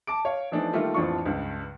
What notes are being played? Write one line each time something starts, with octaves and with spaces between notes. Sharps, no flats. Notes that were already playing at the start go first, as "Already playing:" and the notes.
A5 D6 D7
C#5 F5
E3 F3 A3 B3 D4 D#4
D#3 G3 A3 A#3 F4
A1 F2 F3 D4 F4 C#6
C#2 G2